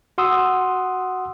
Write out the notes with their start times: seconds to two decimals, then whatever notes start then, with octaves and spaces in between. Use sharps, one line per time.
0.18 F#4 F#5 C6 D#6 E6